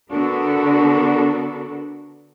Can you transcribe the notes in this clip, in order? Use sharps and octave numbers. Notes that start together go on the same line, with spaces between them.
D3 B3 D4 F#4 A4 A#4